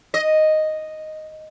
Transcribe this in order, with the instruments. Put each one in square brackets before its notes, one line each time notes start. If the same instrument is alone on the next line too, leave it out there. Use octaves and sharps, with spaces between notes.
[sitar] D#5